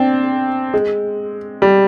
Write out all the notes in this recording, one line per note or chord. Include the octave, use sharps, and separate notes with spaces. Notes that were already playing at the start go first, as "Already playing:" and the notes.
Already playing: C4 D4
G#3
G3